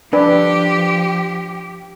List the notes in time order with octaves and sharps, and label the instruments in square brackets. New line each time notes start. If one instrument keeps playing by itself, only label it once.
[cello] F3 G4 [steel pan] D4 B4